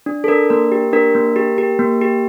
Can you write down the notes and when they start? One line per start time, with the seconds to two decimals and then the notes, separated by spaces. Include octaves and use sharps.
0.06 D4
0.24 A4
0.28 D4 A#4
0.50 A#3 A#4
0.72 G4
0.93 D4 A#4
1.15 A#3
1.36 G4
1.58 G4
1.79 A#3
2.01 G4